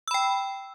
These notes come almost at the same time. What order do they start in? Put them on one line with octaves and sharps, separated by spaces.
E6 B5 G5